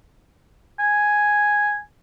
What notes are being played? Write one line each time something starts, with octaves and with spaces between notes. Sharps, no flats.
G#5